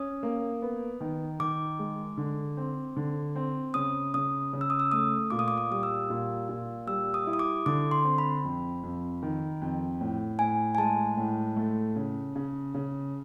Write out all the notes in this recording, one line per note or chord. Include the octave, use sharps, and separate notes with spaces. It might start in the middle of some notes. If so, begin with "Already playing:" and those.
Already playing: C#4 D#6
A#3
B3
D#3
D#3 D6
G#3
D3
C4
D3
C4
C#3 D#6
C#3 D#6
C#3
E6
D#6
E6
A3 D#6
A#2 D6
D#6
D6
D#6
G3 D#6
E6
A#2
A#2
G3 E6
D#6
E4
D#6
D6
D3 D6
C6
C4
B5
F2
F2
D#3
F2
A2
A2 G#5
G#5
G#3 A5
A2
A3
C#3
C#3
C#3